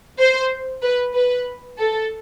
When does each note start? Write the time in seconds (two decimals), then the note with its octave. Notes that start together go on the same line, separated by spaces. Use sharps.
0.19 C5
0.82 B4
1.14 B4
1.78 A4